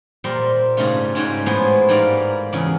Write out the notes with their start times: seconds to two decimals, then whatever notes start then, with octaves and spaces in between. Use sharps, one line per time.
0.24 A#2 G3 A#4 C5
0.77 G#2 C#3 G3 A3 F4
1.15 G#2 G3 G#3 C#4 G5
1.46 A2 G#3 B3 C5 C6
1.88 G#2 G3 B3 A#4 D5 F5
2.53 E2 C#3